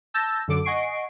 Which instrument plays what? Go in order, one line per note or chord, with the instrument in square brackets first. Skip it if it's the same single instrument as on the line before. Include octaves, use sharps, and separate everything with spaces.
[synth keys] A5 E6 G6 A6 A#6
F#2 D3 F#3 A4 D6 D7
D#5 F#5 G#5 C#6 C7 D7